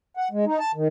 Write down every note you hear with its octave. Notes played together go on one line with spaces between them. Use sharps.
F#5
G#3
D#4
A5
D#3